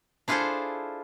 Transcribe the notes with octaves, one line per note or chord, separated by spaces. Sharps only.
D4 E4 F4 G#4 A4 C5